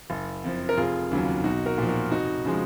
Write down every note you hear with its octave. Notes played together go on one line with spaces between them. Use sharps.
F#1
F2 F3
A#4
F1 F4 G#4
D#2 C#3 F#3
B1 D#4 F#4
F#4 A#4
A#2 F3
F#4 A#4
F1 D#4 F#4
C#3 F3 G#3